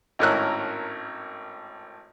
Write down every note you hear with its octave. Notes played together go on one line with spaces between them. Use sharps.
G#1 A2 C#4 A#4 E6 F#6